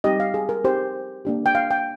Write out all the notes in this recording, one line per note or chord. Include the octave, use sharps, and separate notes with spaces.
G3 C4 D#4 G4 D#5
F5
G#4
A#4
C4 D#4 G4 C5
A#3 D4 G4
G5
F5
G5